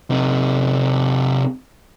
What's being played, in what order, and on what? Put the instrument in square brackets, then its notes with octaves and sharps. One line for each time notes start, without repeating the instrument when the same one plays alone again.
[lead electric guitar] C3 D#4